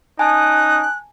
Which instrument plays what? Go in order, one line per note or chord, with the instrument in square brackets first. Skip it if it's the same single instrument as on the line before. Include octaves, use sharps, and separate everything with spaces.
[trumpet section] C#4 D#4 D#6 [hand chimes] G#5 A5 [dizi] F#6